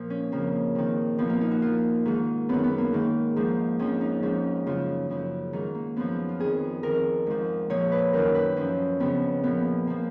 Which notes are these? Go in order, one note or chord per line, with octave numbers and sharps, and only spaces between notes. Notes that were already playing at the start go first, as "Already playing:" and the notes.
Already playing: A#2 F3
C#4
F2 C#3 F3 A#3
F2 D#3
A#2 F3 B3
A#3
D#4
F#4
A#2 F3 F4
G#2 D#3
F#2 D#3 B3
B3
A#3
G#2 D#3
G#2 F3
F2 F3 C#4
D#4
G#2 F3 C#4
F#2 C#3 F3 F4
F#2 C#3 F3
G#2 D#3 D#4
A#3
F#2 F3 B3
F4
F2 D#3 G#4
F2 D#3 A#4
G#2 F3
A#2 F3 C#5
B4
F#2 D#3 A#4
B4
F#2 F3 C#4
F2 C#3 F3 B3
A#2 F3 B3
F3 A#3